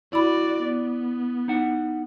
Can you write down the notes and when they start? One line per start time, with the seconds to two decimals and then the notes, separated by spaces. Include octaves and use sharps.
0.13 E4 F#4 D5 B5
0.64 B3
1.48 D#4 F#5